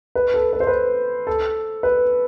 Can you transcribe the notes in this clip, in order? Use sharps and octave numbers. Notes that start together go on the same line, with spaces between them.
B4
A4
B4
C5
B4
A4
B4